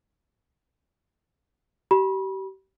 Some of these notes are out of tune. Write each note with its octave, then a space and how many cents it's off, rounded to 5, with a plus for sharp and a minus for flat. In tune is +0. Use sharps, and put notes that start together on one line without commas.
G4 -35 B5 -30